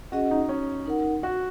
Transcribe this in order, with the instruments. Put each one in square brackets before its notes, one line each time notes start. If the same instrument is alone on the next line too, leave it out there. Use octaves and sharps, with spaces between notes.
[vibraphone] C#4 G#4 D#5 F#5 [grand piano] F#4
[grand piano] D#4
C#4
[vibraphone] D#4 A#4 F#5
[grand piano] F#4